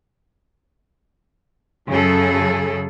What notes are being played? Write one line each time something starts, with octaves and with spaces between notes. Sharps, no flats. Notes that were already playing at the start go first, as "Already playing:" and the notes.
F#2 C#3 F#3 G#4 A4